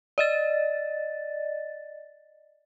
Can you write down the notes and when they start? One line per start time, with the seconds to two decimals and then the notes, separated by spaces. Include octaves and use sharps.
0.18 D5 D#5 A6